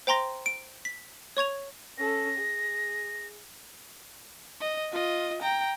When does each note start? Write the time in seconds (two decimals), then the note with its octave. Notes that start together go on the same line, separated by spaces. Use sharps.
0.07 C5 G5 A#5 C6 A#6
0.46 D7
0.85 B6
1.37 C#5 C#6 G#6 F7
1.98 C#4 A4 A#6
2.38 G#4
4.60 D#5
4.92 F4 D#5
5.42 G5 A#5